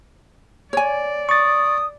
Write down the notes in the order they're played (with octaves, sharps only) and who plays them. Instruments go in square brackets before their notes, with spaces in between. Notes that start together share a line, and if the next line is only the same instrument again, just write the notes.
[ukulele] C#5 G#5 [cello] D5
[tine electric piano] C#6 A6 [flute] D#6